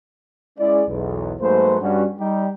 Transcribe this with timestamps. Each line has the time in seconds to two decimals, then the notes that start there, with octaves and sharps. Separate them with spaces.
0.58 G#3 C#4 E4 G#4 D5
0.88 B1 E2
1.41 G#2 F#3 A3 A#3 B4 C5
1.81 G2 G3 C#4 F#4
2.19 G3 D#4 G4